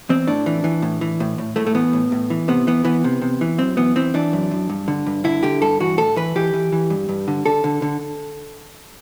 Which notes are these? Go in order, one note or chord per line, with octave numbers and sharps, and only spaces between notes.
E2 C4
A2 D4
E3
E3
A2
E3
A2
A2
A2 A3
A3
E3 B3
A2
A2
E3
C3 B3
E3 B3
E3 B3
C3
C3
E3
F#2 C4
E3 B3
E3 C4
E3 D4
F#2
F#2
G2
D3
G2
D3 E4
D3 G4
G2 A4
E3 F#4
A2 A4
E3 B4
E3 G4
E3
E3
G2
G2
D3
D3 A4
D3
D3